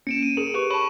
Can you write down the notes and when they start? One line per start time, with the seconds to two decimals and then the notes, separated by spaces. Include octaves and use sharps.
0.07 A#3 C#4 C#7 D7 E7
0.23 D#7
0.37 G#4 A#4
0.54 G4 B4 C#6
0.71 C#5 A5 B5 C#6